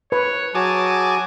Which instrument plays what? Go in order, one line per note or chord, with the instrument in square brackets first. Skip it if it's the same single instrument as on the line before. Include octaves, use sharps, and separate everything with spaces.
[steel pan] B4 [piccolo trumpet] C#5
[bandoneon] F#3 F#4 [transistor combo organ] G#4 A5 D6 [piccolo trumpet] G#5